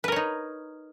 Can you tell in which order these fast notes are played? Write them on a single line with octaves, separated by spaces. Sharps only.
B4 A#4 C#5 D#4